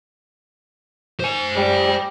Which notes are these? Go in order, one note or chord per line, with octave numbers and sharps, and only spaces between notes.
C5 G#5
G3